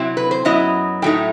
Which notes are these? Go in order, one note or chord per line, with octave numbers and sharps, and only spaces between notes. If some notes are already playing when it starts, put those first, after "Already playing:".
Already playing: C3 F#3 C4 E4
B4
C5
F#2 F#3 B3 E4 D#5
A2 F#3 A3 D#4 G5